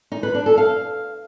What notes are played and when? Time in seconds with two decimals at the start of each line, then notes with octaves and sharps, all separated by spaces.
0.12 D#4
0.23 B4
0.35 D4
0.46 A4
0.58 F5